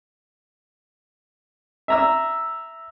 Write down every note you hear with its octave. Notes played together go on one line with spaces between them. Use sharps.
E5 A#5 E6